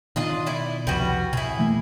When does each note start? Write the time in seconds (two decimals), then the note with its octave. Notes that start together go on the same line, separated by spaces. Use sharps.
0.16 B2 D#3 D4 F4 D#5
0.46 E4 D5
0.87 C2 F2 G3 B3 F#4
1.33 B2 E4 G#4
1.59 E3 A3 A#3